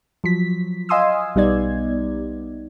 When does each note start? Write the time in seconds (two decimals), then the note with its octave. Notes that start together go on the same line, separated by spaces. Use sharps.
0.24 F3 F#3 B6
0.89 D#5 F5 G#5 C6 D#6 E6
1.35 B1 G3 B3 D#4 D5 G#6